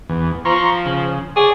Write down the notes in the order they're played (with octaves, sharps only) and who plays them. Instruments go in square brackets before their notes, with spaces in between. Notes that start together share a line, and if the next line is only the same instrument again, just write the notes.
[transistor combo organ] E2
[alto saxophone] F3 [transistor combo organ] A#5 C6 C#6
[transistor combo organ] C#3
[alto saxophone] G#4 [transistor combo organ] C#5 D5